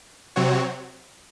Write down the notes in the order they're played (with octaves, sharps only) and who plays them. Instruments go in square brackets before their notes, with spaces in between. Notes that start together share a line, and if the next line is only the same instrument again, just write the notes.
[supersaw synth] C3 F#3 C4 F#4 C#5